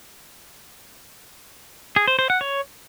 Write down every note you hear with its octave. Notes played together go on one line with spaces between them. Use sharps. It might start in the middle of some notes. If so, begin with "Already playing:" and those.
G#4
C5
C5
F#5
C#5